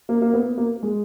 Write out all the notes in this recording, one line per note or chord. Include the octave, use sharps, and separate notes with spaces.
A#3
A#3
B3
A#3
G#3